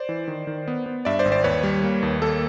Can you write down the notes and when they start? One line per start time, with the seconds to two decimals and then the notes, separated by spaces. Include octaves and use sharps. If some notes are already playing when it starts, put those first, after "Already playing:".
Already playing: C5 D5
0.09 E3
0.28 D#3
0.47 D#3
0.68 B3
0.86 B3
1.05 G2 D5 E5
1.19 C5 D5
1.25 G#1
1.32 C5 D5
1.44 D#2 B4 C#5
1.63 G3
1.84 A#3
2.03 D#2
2.22 A#3 A4